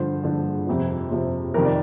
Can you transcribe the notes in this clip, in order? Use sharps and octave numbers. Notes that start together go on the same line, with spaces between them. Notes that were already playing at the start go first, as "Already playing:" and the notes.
Already playing: G2 D3 F3 C5
G2 D3 F3
F2 C3 F3
F2 C3 F3
F2 C3 D#3 A#4
D5